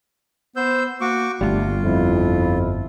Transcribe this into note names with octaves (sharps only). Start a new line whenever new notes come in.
B3 C5 E6 G6
A#3 F#4 C#6 D6
G1 C#2 G3 A3 F4
F2 F3 E4